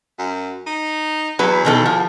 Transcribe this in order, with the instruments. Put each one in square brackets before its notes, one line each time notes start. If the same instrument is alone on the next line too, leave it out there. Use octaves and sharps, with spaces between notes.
[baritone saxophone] F#2
D#4
[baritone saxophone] E2 [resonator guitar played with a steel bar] F#3 B4
[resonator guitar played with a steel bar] B2 D#3 A4
F3